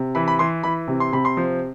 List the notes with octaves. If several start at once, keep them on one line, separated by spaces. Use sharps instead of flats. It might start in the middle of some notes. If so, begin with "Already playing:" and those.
Already playing: C3
E3 B5
B5
E3 C6
E3 B5
C3
C6
C3 B5
C6
F3